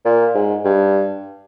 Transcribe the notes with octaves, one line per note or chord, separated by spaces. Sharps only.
A#2
G#2
G2